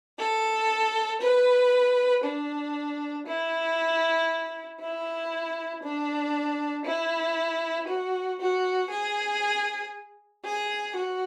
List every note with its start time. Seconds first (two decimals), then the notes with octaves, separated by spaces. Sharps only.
0.19 A4
1.21 B4
2.24 D4
3.27 E4
4.80 E4
5.82 D4
6.85 E4
7.88 F#4
8.40 F#4
8.90 G#4
10.44 G#4
10.96 F#4